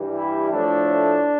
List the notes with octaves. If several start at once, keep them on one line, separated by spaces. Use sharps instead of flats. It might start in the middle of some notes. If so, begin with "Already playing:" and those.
Already playing: G2 E3 G3
E4
A2 F3 A3 D4